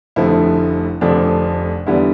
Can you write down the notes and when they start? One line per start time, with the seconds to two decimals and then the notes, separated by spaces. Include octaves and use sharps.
0.16 F1 F2 D3 F3 A3 E4
1.01 F1 F2 D3 F3 A3 D4
1.87 E2 D3 G3 B3 E4